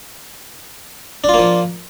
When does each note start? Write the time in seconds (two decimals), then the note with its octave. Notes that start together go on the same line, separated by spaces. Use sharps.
1.24 D4
1.29 F4
1.34 A#3
1.39 F3